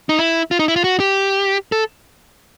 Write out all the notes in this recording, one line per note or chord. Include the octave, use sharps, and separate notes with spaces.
D#4
E4
F4
D#4
E4
F4
F#4
G4
A4